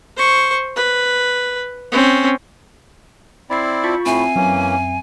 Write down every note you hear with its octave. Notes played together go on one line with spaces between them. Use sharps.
C5 C#6
B4
C4 C#4
C4 E4 D5 B5 G#6 C7
F4 A5 B5 C#6
A2 C4 E5 G#5 C7
F#2 E3 A#3 C#4